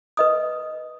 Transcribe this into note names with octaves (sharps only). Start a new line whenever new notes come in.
B4 D#5 D#6